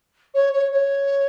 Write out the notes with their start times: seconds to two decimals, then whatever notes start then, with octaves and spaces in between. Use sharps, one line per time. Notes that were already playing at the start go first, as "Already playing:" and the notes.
0.34 C#5
0.53 C#5
0.71 C#5